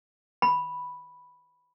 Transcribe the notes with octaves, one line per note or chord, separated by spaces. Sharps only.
B5